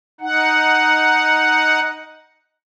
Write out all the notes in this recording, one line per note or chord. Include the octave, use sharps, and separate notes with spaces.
D#4 F#5